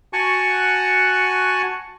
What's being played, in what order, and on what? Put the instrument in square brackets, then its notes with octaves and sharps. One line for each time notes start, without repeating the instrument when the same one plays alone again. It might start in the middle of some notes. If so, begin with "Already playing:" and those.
[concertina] F#4 F#5 G#5 A5 C#6